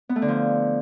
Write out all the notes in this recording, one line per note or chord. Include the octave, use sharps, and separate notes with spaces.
B3
A3
D3
F3